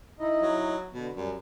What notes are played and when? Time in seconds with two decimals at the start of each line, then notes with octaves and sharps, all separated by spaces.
0.19 D#4 E4 D#5
0.41 F#3
0.94 B2 D3
1.15 F#2 G3